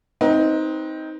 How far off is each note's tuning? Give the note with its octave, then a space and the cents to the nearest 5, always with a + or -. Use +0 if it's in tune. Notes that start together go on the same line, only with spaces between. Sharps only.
C4 +0 D#4 +15 B4 -20